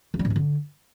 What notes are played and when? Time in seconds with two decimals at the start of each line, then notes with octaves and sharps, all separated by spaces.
0.14 C#3
0.19 G3
0.25 G#2
0.30 C3
0.36 D3